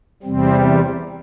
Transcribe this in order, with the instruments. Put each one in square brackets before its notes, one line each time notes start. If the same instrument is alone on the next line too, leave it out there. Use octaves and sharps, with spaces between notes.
[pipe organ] E2 C3 G3 C4